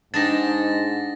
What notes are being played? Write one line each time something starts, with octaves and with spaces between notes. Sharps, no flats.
G#2 D4 D#4 G4 A6 A#6